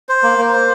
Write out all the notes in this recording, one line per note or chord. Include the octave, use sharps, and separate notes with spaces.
C5
A#3
A#3
C5